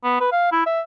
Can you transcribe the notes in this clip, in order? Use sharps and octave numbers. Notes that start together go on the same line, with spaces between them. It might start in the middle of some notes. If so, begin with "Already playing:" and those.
B3
B4
F5
E4
E5